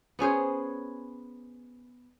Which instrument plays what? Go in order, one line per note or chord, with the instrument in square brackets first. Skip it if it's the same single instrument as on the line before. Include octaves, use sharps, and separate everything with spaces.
[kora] B3 C#4 G#4 C5